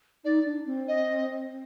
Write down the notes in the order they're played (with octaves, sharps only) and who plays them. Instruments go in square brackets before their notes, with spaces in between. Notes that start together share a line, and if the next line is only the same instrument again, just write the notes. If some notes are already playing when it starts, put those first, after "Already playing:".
[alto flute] D#4 [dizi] D5
[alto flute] D4
C4
[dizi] D#5